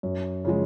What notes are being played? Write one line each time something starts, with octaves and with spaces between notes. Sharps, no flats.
F#2
C#3 F3 G#3